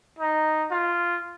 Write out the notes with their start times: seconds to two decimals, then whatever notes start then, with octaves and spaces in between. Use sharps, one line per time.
0.19 D#4
0.71 F4